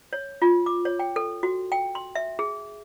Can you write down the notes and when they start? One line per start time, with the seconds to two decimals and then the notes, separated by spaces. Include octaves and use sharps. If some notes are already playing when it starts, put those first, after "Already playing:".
0.13 C#5
0.42 F4
0.66 D6
0.85 C#5
0.99 G5
1.16 A4
1.43 F#4
1.72 G5
1.95 C6
2.15 E5
2.39 G#4